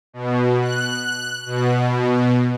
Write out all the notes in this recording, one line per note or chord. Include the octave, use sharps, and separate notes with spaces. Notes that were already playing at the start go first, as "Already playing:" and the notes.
B2
F#6
B2